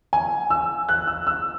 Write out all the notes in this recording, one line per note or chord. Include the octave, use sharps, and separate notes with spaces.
G#5
E6
F#6
E6
E6